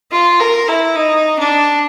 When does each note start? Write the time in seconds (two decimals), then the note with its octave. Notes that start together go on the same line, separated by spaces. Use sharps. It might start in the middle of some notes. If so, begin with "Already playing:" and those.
0.11 F4
0.40 A#4
0.68 E4
0.96 D#4
1.39 D4